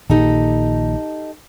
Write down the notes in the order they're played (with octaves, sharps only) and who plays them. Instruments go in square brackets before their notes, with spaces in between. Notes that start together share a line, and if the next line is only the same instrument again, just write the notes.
[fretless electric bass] A#1 A#2 D#3 [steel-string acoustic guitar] D#4 G4 A4